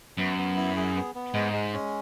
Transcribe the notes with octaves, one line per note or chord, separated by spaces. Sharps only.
F#2 B3
B3
E4
G#4
B3
B3
G#2 G#3
G#3
C#4